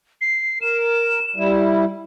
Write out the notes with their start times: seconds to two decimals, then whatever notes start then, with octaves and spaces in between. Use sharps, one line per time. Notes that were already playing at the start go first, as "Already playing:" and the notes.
0.21 C7
0.62 A#4 E7
1.36 G3 E4